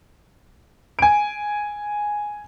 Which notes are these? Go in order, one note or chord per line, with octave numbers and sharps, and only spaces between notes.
G#5 D7